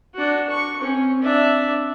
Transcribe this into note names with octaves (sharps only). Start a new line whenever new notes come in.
D4 F#4
C#6
C4 C#4
D4 E5